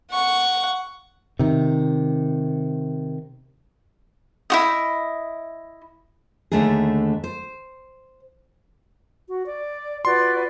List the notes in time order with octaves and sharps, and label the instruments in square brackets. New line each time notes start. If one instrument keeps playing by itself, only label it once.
[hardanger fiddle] F#5 C#6
[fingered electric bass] C3 D#3
[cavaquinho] E4 F#4 D#5
[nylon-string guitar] D#2 D3 A3 D4 D#4 G#4
C5
[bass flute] F#4
D5
[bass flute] F4 [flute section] F#4 B4 D5 [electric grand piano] C6